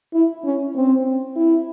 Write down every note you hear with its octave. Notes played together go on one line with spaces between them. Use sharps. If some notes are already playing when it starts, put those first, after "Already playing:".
E4
C#4
C4
E4